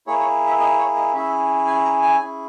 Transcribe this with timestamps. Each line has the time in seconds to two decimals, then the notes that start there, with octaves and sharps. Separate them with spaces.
0.07 A#3 E4 G#4 C#5
0.19 C#5
0.47 E5
0.60 D#5
0.78 C#5
0.96 D#5
1.13 C#4 E4 G#4 E5
1.67 G#5
1.85 A#5
2.02 G#5
2.20 C#4 E4 G#4